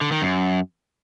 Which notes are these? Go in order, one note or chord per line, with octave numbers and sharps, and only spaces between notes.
D3
D#3
F#2